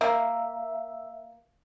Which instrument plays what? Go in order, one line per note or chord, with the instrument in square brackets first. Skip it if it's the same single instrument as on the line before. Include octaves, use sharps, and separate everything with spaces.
[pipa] A#3 [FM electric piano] E5